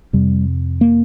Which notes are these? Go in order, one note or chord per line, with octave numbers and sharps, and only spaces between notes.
F2 C3 G3
A#3